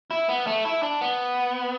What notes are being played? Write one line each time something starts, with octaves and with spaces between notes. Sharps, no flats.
E4
B3
A3
E4
D4
B3